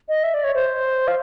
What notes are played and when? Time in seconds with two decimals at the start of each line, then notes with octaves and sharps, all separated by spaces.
0.09 D#5
0.23 E5
0.34 D5
0.44 C#5
0.54 C5
1.08 F5